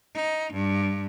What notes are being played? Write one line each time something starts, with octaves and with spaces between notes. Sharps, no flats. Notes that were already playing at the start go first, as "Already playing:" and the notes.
D#4
G2